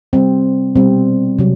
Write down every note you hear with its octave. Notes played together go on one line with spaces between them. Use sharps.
C3 G3 C4
B2 G3 C4
C3 F#3